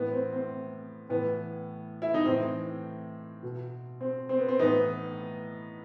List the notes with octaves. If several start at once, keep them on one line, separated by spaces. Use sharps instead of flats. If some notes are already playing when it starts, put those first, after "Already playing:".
Already playing: A2 E3 B3
C4
C4
A2 E3 B3
E4
D#4
A2 E3 C4
B2
C4
C4
B3
C4
A2 E3 B3 D#4